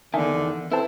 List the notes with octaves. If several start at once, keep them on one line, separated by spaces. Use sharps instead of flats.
E2 D3 D#3 E5 G#5 A5
C4 E4 A4 B4 A5